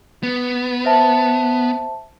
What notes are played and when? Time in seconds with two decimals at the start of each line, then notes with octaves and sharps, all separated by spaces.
0.23 B3
0.85 C5 E5 A5